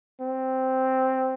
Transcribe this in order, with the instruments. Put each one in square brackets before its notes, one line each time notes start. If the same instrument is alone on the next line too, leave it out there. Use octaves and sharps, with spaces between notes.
[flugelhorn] C4